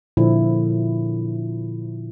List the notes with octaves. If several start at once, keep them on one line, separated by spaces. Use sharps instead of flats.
A#2 D3 F3 E4